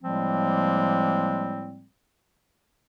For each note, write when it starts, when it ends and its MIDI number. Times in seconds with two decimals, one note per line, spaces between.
0.04 1.86 45
0.04 1.86 53
0.04 1.86 55
0.04 1.86 56
0.04 1.86 58
0.04 1.86 60